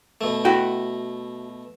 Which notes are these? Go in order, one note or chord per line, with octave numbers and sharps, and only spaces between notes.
B2 A3
E4 F#4 G5